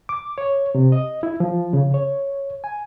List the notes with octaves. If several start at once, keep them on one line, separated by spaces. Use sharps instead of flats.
D6
C#5
C3
D#5
E4
F3
C#3
C#5
G#5